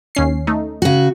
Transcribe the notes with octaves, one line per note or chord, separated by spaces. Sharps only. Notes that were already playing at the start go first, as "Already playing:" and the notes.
D#2 C#4 C7
A3 D#4
C#3 F#4